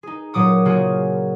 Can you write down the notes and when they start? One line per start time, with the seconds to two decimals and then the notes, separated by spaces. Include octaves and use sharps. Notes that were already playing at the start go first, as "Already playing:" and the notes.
0.03 D#4 G#4
0.33 A#2 F#3 D6 D#6 C#7
0.65 C#3 A#3 F4 F#4 G#4